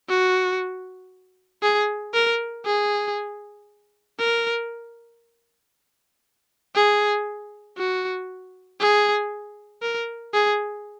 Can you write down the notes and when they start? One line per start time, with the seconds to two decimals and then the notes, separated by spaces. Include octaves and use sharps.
0.09 F#4
1.62 G#4
2.14 A#4
2.65 G#4
4.19 A#4
6.75 G#4
7.77 F#4
8.80 G#4
9.82 A#4
10.34 G#4